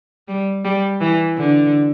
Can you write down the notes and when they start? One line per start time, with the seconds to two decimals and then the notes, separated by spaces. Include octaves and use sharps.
0.28 G3
0.65 G3
1.01 E3
1.37 D3